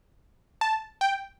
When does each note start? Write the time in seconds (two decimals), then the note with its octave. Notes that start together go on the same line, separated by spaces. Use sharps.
0.61 A5
1.01 G5